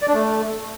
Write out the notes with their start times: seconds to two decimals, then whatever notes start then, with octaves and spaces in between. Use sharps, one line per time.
0.02 D5
0.08 D4
0.14 A3